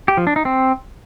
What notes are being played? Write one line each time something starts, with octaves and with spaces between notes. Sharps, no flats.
G4
F3
D4
D#4
C4